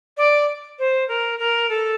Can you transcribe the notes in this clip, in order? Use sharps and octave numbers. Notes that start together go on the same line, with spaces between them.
D5
C5
A#4
A#4
A4